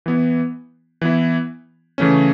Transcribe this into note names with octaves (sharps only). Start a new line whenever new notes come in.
E3 B3 E4
E3 B3 E4
C#3 E3 A3 C#4